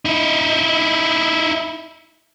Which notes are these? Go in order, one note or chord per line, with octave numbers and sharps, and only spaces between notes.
D#4 E4